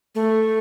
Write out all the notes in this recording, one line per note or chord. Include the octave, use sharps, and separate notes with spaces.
A3